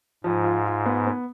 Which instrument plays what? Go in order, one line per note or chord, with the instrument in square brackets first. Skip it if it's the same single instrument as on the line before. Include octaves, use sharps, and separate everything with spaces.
[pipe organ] G#2 [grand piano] F3
[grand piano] F4
F4
B3
B3